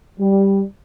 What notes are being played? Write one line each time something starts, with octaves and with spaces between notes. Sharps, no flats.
G3